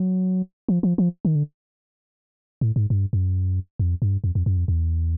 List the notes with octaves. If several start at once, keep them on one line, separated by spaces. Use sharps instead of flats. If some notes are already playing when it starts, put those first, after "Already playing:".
Already playing: F#3
F3
F3
F3
D#3
D3
A2
G#2
G2
F#2
F2
G2
F2
F2
F#2
F2
E2